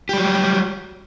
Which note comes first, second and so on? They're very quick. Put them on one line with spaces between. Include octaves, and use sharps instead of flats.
G4 G3 F#3